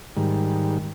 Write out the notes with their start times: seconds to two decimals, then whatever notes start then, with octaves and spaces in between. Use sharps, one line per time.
0.17 G#2 D#3 G3